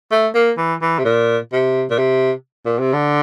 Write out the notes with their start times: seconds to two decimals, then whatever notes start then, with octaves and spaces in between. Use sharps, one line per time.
0.12 A3
0.35 A#3
0.58 E3
0.82 E3
0.99 C3
1.05 A#2
1.53 C3
1.91 A#2
1.99 C3
2.66 A#2
2.80 C3
2.94 D3